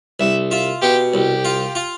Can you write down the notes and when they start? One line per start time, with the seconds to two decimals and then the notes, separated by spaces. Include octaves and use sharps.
0.20 C2 E5
0.51 F4 E5
0.82 B2 G4
1.14 C2 G4
1.45 F4
1.75 F4